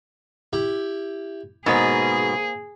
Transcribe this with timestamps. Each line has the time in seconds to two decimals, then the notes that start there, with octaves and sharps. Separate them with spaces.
0.53 E4 G4
1.66 G#2 B2 A#3 C4 G#4